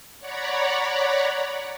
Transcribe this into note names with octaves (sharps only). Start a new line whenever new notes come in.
C#5 D5 F#5 A#5 B5